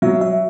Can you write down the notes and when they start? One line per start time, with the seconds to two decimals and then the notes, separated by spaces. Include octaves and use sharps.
0.02 F#3 E5
0.21 E5